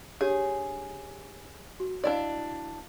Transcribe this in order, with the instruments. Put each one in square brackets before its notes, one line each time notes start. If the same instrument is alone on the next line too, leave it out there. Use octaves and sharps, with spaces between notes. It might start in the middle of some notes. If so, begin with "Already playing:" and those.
[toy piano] D4 G4 C#5 [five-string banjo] G#4
[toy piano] F#4
[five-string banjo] D4 E4 D5 [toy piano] D#5 F5